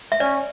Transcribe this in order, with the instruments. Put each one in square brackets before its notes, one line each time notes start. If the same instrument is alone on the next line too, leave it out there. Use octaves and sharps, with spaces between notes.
[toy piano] E5
[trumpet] C#4 [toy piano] D5